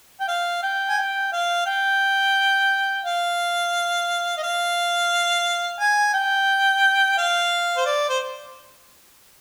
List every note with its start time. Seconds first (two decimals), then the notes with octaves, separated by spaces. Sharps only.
0.20 G5
0.28 F5
0.63 G5
0.89 G#5
0.98 G5
1.33 F5
1.66 G5
3.05 F5
4.37 D#5
4.43 F5
5.79 G#5
6.14 G5
7.18 F5
7.77 C5
7.86 D5
8.09 C5